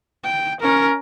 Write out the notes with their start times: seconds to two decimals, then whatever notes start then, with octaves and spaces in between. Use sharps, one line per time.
0.24 G5
0.61 C#4 A#4